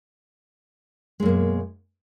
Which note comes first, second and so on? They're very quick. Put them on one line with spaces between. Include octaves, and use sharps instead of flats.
G#3 F#2 A#3 B2